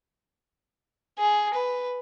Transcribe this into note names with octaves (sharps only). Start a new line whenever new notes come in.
G#4
B4